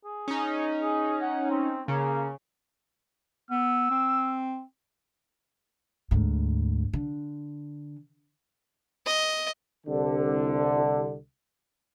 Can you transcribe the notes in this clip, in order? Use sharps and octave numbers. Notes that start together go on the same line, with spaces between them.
G#4
C#4 D#4
G#4
F#5
C4
C#3 A#3 C#4
B3 E6
C4
D2 G#2
D3
D#5
C2 D3